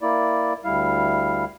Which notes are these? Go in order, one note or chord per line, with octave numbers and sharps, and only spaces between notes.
A#3 E4 D5
D2 G3 E4 F5